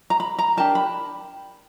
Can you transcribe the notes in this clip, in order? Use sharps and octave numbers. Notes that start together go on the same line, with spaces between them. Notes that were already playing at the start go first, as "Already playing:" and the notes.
A#5
B5
A#5
D4 G4 A#4 A5
B5